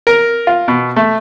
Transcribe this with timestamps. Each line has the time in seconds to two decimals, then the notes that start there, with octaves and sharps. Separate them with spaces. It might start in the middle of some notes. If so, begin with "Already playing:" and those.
0.07 A#4
0.47 F4
0.68 B2
0.96 A3